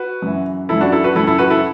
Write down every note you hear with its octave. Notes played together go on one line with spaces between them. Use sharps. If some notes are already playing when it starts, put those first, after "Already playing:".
Already playing: F#4 B4
F#2 E3
F#2 E3 E4 A4
D4 F#4
E4 A4
F#4 B4
F#2 E3 E4 A4
E4 A4
F#4 B4
E4 A4